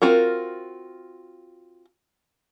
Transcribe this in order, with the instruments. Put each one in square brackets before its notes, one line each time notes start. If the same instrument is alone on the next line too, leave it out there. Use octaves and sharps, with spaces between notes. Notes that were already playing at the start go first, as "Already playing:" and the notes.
[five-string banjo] C4 F4 F#4 A#4